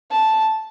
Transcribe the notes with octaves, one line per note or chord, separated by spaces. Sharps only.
A5